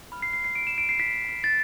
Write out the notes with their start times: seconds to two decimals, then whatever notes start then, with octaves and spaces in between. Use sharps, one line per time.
0.12 B5 F6
0.22 C7
0.33 C7
0.44 C7
0.55 D7
0.67 E7
0.78 D7
0.89 C7
1.00 B6
1.44 A6